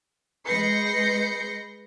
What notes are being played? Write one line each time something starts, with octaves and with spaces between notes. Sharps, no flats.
G#3 B4 G6 A#6 C7 C#7